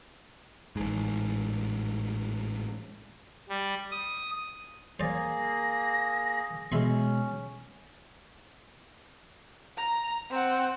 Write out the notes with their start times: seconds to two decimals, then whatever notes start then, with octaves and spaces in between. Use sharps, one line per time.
0.76 A1 G#2
3.49 G3
3.91 D#6
5.00 A#3 G#4 C5 D5 A#6
6.72 B2 G#3 C#4 E5 B5 C6
9.77 A#5
10.30 C4 F#5